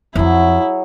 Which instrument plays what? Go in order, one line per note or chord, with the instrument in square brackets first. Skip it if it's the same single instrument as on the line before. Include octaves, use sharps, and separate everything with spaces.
[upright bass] F2 F3 [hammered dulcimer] F#3 G#4 E5 [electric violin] E4